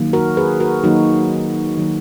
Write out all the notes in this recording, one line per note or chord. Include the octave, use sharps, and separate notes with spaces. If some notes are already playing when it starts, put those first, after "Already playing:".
Already playing: D#3 F#3 A#3
F#4 A#4
G#4 B4
F#4 A#4
D#3 F#3 A#3 D#4 F#4
D#3 F#3 A#3